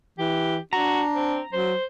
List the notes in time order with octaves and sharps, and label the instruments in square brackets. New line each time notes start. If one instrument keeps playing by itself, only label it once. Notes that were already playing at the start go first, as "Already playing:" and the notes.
[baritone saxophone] E3 [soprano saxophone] G4
[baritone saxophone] D4 [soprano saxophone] F#4 [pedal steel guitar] A#5
[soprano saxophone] C4
[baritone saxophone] F#3 [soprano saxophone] C5